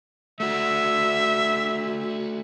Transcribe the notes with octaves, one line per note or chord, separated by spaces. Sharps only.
A3 F#4 E5